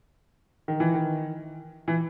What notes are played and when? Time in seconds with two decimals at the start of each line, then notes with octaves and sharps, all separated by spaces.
0.68 D#3
0.80 E3
0.94 D#3
1.88 E3